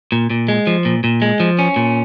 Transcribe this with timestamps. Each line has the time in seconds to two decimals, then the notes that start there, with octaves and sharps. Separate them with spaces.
0.12 A#2
0.30 A#2
0.48 G#3
0.67 F3
0.85 A#2
1.04 A#2
1.22 G#3
1.40 F3
1.59 C#4
1.76 A#2